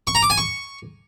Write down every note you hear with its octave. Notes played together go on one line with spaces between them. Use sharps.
C#6
A#5
D6
G#5
C#6